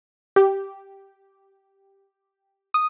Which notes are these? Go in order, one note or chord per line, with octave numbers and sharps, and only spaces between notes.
G4
D#6